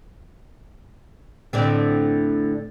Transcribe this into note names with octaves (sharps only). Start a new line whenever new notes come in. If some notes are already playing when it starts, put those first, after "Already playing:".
A2 D3 C4